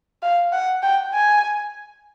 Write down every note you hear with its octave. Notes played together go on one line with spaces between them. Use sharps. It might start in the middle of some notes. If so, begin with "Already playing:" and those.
F5
F#5
G5
G#5